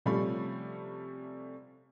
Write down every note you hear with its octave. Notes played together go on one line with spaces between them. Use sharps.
C3 F3 G3 A3 C#4 B5